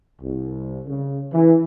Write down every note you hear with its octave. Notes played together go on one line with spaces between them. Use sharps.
C2
C#3
E3